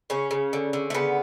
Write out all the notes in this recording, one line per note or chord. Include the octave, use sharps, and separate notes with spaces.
C#3 C#4
C#3
D3
D3
A3
C#3 B3